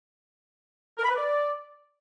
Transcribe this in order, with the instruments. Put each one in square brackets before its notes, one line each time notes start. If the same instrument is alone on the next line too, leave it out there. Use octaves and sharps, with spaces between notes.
[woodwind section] A#4
B5
B4
D5